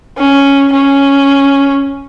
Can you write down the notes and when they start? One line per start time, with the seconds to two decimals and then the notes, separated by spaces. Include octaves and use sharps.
0.18 C#4
0.73 C#4